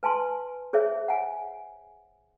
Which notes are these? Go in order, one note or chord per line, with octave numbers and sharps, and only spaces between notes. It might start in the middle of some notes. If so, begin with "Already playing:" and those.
B4 G#5 A5 C6
G#4 C5 C#5 E5
F#5 G#5